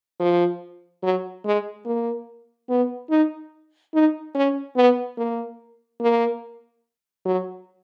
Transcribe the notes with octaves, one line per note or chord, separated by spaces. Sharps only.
F3
F#3
G#3
A#3
B3
D#4
D#4
C#4
B3
A#3
A#3
F#3